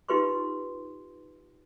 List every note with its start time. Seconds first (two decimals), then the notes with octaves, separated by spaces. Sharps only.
0.08 D#4 F4 G4 B4 C6 C#6